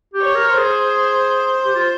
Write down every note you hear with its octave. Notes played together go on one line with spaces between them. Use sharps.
G4
C#5
A#4
C5
G#4
G4
F4